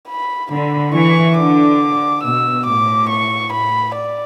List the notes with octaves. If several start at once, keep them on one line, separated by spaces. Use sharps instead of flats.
B5
D3 B5
E3 C#6
D3 D6
B2 E6
A2 D6
C#6
B5
D5